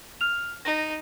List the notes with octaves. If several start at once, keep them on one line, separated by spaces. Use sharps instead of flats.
F6 F7
D#4 A#6